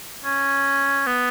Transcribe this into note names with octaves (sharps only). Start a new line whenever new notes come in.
C#4
B3